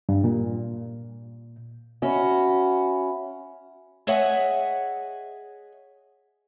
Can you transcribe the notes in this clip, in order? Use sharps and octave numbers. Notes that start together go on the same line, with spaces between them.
G2
A#2
C#4 F#4 E5 F#5 B5
G#4 C#5 D#5 E5 F#5